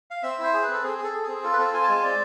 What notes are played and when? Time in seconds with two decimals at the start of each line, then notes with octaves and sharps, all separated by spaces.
0.11 F5
0.23 C4 E5
0.38 E4 C5
0.54 G#4
0.63 C4 B4
0.74 A4
0.83 C4 G#4
0.98 G#4
1.04 A4
1.13 G#4
1.23 C4 G#4
1.43 F4 A4
1.53 B4
1.58 C4 A4
1.74 F4 G#5
1.83 A5
1.88 G#3 G#5
2.03 C4 D5